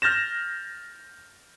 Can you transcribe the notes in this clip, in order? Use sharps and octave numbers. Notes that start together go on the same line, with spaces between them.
F6 G6 A6 A#6 E7